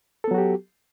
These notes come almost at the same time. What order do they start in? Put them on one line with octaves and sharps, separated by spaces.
A4 B3 F#3 F#4 G4